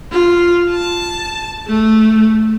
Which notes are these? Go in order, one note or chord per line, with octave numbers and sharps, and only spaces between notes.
F4
A5
A3